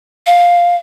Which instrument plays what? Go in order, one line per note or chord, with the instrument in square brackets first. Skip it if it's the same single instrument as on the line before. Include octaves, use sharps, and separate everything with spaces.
[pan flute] F5